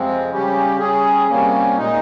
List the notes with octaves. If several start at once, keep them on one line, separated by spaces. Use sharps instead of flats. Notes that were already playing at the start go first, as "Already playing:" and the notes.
Already playing: F2 C3 F3 G#3 C4
C#3 G3 C#4 G4
G3 C#4 G#4
C3 G3 A#3 C#4
A#2 G#3 D#4